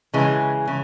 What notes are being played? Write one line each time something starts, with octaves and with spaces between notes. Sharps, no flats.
C#3 E3 G#3
C#3